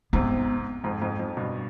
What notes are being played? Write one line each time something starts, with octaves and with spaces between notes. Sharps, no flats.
G#2 C3 B3
F2 G#2
F2 G#2
F2
G2 B2